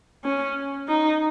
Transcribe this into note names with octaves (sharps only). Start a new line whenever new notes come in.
C#4
D#4